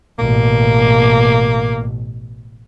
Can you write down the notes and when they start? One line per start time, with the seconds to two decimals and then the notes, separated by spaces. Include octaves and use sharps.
0.19 A1 B2 A#3